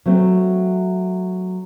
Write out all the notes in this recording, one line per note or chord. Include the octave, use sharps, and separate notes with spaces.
F#3 A3 C4